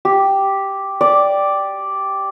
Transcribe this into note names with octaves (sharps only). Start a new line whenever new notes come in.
G4
D5